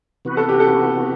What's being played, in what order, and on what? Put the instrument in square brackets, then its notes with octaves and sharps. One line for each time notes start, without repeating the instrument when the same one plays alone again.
[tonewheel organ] C3 E3 B3 F#4 B4
[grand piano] A4
G4
A4